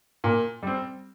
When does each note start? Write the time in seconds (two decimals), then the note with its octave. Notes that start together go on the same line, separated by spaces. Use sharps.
0.24 A#2
0.63 G3 C4